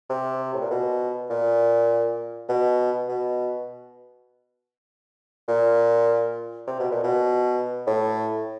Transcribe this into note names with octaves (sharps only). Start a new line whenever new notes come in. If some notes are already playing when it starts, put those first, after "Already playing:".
C3
A2
A#2
B2
A#2
B2
B2
A#2
C3
B2
A#2
B2
A2